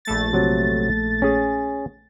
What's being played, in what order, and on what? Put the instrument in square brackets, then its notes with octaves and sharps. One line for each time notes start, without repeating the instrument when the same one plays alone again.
[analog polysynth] A#1 A3 A6
[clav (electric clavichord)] C3 F#3
C#4 G#4